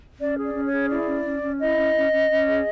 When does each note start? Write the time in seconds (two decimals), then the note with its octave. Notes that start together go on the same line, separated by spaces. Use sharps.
0.19 C#4 D5
0.36 G#4
0.43 D5
0.54 C#4
0.66 C#5
0.72 G#4
0.89 E4 D5
1.07 C#4
1.25 C#4
1.42 C#4
1.59 E4 D#5
1.77 C#4
1.95 C#4
2.12 C#4
2.30 C#4
2.47 G#4